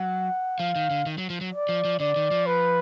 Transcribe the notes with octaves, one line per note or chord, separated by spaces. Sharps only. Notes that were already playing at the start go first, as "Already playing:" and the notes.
Already playing: F#3 F#5
F3 F5
D#3
D3
D#3
F#3
F3
F#3
D5
F3
F3
D3 D5
D#3
F3
B4